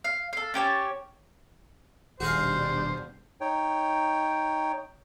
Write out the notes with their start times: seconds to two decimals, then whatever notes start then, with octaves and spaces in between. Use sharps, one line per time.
0.04 F5
0.33 A4 F5
0.54 C#4 G4 C#5 A5
2.20 D#1 B2 G3 D4 F#4 G#4 C5 F5
3.41 D#4 C#5 G5